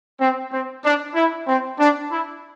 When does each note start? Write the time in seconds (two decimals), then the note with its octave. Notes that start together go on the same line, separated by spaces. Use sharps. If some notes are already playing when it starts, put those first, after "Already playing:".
0.20 C4
0.52 C4
0.84 D4
1.15 E4
1.48 C4
1.79 D4
2.11 E4